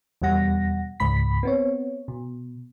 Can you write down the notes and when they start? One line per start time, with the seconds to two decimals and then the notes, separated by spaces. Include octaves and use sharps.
0.22 E2 B2 G3 F#5 A#6
1.00 C#2 G#2 B5 B6
1.43 B3 C4 C#5
2.08 B2